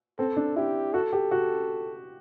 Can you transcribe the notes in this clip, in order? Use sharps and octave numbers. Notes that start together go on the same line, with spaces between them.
C4 A4
D4
E4 G4
F#4 A4
G4
F#4